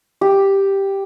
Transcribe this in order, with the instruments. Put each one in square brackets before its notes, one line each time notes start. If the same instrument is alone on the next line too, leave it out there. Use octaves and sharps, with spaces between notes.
[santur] G4